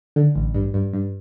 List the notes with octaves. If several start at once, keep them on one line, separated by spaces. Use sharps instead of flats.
D3
A1
G2
G2
G2